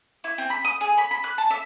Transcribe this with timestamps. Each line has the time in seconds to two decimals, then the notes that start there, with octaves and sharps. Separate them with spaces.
0.24 E4
0.38 C4
0.50 B5
0.65 D#6
0.81 G#4
0.98 B5
1.11 B5
1.24 F#6
1.38 A5
1.51 E5